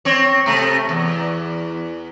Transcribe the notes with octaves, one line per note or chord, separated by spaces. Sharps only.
C4 C#5
C3 A3
E2